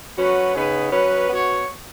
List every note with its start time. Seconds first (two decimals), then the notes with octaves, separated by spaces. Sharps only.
0.17 F#3 C#4 F#4 B4
0.55 C#3 B3 D#4 G#4 B4
0.92 F#3 C#4 B4
1.29 B3 F#4 C#5